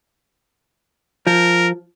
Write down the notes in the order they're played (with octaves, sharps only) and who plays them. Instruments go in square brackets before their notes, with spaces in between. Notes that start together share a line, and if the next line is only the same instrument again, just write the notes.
[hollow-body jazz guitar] F3 [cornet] A#4